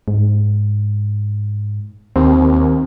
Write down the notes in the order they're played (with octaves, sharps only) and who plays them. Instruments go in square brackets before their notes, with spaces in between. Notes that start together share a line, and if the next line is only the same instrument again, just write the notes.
[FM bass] G#2
[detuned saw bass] D#2 [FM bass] C4